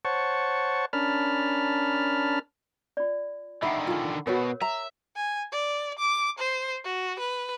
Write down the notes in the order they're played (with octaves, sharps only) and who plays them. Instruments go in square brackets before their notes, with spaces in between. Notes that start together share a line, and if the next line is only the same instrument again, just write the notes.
[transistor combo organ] C5 C#5 F#5 A5 C#6
C#4 D4 A#4 A5 B5 F6
[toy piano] F4 D5
[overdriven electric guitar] D3 D#3 [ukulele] E5 [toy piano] F#5 B5
[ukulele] F4 G#4
[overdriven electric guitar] B2 [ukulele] F#4 B4 [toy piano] A#4 C#5
[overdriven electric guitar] E5 [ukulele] A#5
[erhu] G#5
D5
D6
C5
F#4
B4